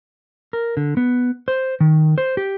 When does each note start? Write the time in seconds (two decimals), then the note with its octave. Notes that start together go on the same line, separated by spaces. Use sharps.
0.53 A#4
0.77 D3
0.97 B3
1.48 C5
1.80 D#3
2.18 C5
2.37 G4